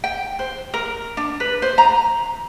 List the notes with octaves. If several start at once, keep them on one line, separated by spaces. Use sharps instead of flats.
G5
C5
A#4
D4
B4
C5
A#5